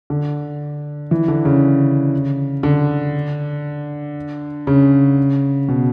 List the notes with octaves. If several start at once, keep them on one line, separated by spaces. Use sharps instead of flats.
D3
E3
D3
C#3
D3
C#3
B2